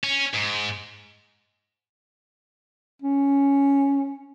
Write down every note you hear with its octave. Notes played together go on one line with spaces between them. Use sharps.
C#4
G#2
C#4